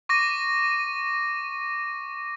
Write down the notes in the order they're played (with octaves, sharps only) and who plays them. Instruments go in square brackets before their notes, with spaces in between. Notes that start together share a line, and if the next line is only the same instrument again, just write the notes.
[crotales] C#6 D6 A#6 D#7